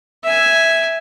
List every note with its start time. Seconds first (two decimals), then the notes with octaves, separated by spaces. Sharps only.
0.24 E5 G#5